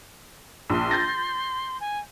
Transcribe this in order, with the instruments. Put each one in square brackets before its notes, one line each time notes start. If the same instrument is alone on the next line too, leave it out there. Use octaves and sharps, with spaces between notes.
[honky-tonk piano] A#1 [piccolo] C6
[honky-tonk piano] G6 A6 A#6
[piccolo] G#5